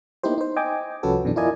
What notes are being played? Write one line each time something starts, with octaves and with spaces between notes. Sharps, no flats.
A#3 B3 D#4 E4 G4 C5
D#4 C5
D#5 G5 G#5 D6
C2 F3 C#4 F#4 A4 B4
F#2 B2 E3 D4
E4 F4 A#4 D5 D#5 G#5